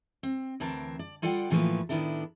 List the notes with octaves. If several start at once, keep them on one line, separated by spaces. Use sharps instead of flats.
C4
D2 E3 C4 A#4 A5
D5
G3 F4 A4 D5 F#5 G5
A2 E3 F3 A3 A#3 B4
A2 D#3 B3 D4 E4 A4